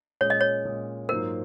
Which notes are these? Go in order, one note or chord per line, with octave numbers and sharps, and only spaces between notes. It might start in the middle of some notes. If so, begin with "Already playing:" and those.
A#2 G#3 C#4 C#5
D#5
C#5
A#2 G#3 C#4
G#2 F#3 A#3 F4 A#4 C5